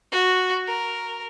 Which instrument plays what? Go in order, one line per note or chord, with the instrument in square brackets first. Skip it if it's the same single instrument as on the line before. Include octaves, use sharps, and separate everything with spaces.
[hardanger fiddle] F#4
A#4